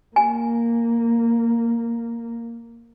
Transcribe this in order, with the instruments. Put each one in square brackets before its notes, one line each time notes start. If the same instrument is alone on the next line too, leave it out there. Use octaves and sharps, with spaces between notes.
[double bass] A#3 [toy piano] G#5